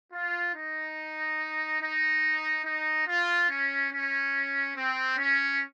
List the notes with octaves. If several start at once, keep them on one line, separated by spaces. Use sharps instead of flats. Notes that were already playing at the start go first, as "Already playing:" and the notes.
F4
D#4
D#4
D#4
F4
C#4
C#4
C4
C#4